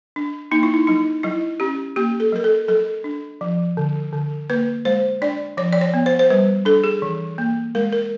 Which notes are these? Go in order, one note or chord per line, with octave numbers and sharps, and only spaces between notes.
D4
A#3 D#4
E4
D#4
F#3 D#4
F#3 E4
C#4 G4
A#3 G4
A4
F#3 A#4
A4
F#3 A4
D4
F3
D3
D3
A#3 B4
G#3 C5
D4 D5
F3 C#5
D5
C#5
B3
C5
C5
G3 B4
D4 A4
G#4
E3
A#3
G#3 A#4
A#4